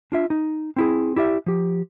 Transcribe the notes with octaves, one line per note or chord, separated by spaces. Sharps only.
D4 F4 E5
D#4
C4 E4 G#4
E4 G4 D5 E5
F3 G4